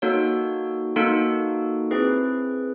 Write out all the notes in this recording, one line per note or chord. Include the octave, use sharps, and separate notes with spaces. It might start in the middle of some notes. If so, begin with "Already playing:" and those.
A#3 D#4 F#4 A4 C#5
A#3 D#4 F#4 A4
C4 E4 G#4 B4